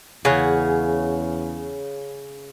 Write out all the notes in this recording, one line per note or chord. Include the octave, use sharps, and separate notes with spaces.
E2 C#3 G#4 C#5 F#5